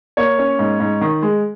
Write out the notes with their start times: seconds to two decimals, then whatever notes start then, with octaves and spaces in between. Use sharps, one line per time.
0.17 A#3 C#5
0.39 C#4
0.59 G#2
0.80 G#2
1.01 D#3
1.22 G#3